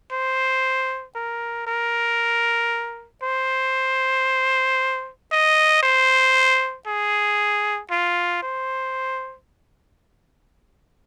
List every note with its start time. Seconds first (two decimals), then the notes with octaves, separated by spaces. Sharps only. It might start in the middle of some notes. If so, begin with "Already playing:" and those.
0.12 C5
1.15 A#4
1.67 A#4
3.23 C5
5.32 D#5
5.83 C5
6.87 G#4
7.91 F4
8.43 C5